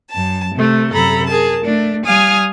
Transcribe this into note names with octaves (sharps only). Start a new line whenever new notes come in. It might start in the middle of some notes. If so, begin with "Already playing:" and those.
F#2 A5
C3 A3
F#2 C3 A4 A#5 B5
G#4 A#4 A5
A3 D4
G3 F5 G#5 D#6 F6